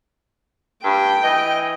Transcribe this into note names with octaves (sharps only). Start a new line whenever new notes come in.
G2 G5
E3 D#5